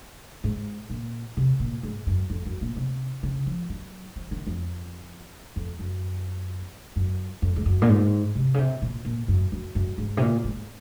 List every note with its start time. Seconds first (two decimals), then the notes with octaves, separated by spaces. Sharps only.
0.44 G#2
0.90 A#2
1.37 C3
1.60 A#2
1.83 G#2
2.07 F#2
2.30 F2
2.46 F#2
2.61 A#2
2.77 C3
3.23 C#3
3.46 F3
3.70 F#3
4.16 F3
4.31 D#3
4.47 F2
5.56 F2
5.79 F#2
6.96 F#2
7.42 F2
7.56 G#2
7.66 F#2
7.82 A#2
7.89 G#2
8.35 C3
8.54 C#3
8.58 C3
8.82 A#2
9.05 A#2
9.28 F#2
9.52 F#2
9.75 F#2
9.98 G#2
10.17 C3
10.21 A#2
10.44 G#2